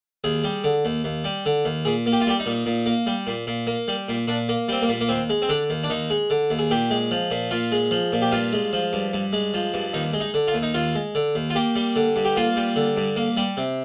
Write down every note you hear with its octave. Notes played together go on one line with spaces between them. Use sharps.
D#2 G#4
G3
D3
D#2
D#2
G3
D3
D#2
A#2 G#4
A#3
G4
F4
G3 G4
D#4
A#2
A#2
A#3
G3
A#2
A#2
A#3
G3
A#2
A#2 D4
A#3
G3 C4
A#3
A#2
A#3
D#2 C4
G#3
C4
D3 D4
D#2
D4
D#2 D#4
G#3
D3
D#2
G#4
A#2 G4
G#3
F3
A#2
A#2 F4
G#3
F3
A#2
G4
G2 F4
G#3
F3
G2
G2
G#3
F3
G2
D#2 D#4
G#3
D#4
D3
F4
D#2
D#4
D#2 F4
G#3
D3
D#2
F4
A#3 G4
G3
D3
G2
G4
A#3 F4
G3
D3
G2
A#3
G3
C3